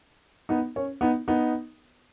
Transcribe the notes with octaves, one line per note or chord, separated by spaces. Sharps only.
B3 D#4
C#4
B3 D#4
B3 D#4